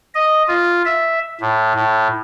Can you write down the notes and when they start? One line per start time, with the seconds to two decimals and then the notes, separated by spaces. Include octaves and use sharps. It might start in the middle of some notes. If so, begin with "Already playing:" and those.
0.15 D#5
0.48 F4
0.85 E5
1.41 A2
1.74 A2